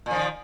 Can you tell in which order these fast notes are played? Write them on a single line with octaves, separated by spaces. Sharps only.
A#2 F3 D#3